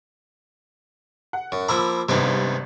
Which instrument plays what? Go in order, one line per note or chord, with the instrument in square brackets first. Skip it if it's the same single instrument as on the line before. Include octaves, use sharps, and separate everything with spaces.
[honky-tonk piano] F#5
[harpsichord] F#2
[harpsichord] F3 A#3 A#5 [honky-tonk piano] B5 D6 E6
[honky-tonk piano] G#1 G2 [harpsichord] C3 B3 D#4